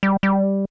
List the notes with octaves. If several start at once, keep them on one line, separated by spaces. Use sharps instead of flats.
G3
G3